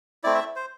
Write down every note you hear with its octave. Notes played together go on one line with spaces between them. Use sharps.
A3 C4 E4 D5
E5
C5